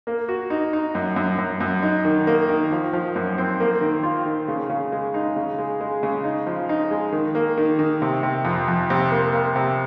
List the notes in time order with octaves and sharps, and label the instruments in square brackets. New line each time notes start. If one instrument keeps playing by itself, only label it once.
[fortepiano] A#3
F#4
D#4
D#4
F#2
F#2
F#2
F#2
D#4
D#3
A#3
D#3
F3
F3
F#2
C4
A#3
D#3
F4
D#3
C#3
C#3
G#3
D#4
C#3
G#3
G#3
C#3
D#4
F3
D#4
G#3
D#3
A#3
D#3
D#3
C3
C3
F2
F2
C3
A#3
A#3
C3